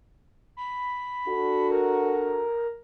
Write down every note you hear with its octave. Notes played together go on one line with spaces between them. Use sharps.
B5
D4 F#4 A4
A#4